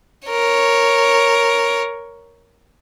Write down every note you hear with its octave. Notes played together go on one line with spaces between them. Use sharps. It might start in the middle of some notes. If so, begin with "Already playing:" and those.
A#4 C#5